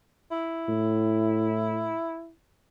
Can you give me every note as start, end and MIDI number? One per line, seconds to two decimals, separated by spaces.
0.31 2.32 64
0.69 1.95 45